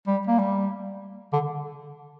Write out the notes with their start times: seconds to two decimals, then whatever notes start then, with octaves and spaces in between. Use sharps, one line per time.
0.07 G3
0.27 A#3
0.39 G3
1.33 D3